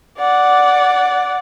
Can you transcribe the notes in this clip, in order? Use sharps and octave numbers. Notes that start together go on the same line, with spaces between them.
D5 F#5